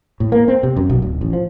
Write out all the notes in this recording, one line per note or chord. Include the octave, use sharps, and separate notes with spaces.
A2
A#3
C4
C3
F#2
B1
D1
A1
F3